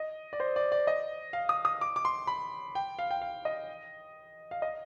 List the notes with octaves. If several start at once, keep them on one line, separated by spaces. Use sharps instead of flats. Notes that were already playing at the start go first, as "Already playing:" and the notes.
Already playing: D#5
D5
C5
D5
D5
D#5
F5
D#6
D#6
D6
D6
C6
B5
G5
F5
G5
F5
D#5
F5
D#5